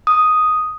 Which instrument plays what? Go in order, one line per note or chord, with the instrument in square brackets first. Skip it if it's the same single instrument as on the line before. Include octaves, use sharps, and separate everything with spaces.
[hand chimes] D#6